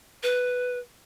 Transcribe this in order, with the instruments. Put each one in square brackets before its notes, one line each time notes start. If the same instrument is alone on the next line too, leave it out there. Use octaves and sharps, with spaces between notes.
[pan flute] B4